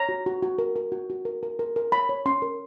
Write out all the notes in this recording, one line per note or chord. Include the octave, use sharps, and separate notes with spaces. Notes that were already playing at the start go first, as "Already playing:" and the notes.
Already playing: C#5 A#5
F#4
F#4
F#4
A#4
A#4
F#4
F#4
A#4
A#4
A#4
A#4
C#5 B5
C#5
C#4 C6
A#4